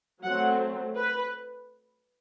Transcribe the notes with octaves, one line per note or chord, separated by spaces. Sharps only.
F#3 A3 C4 F#5
B4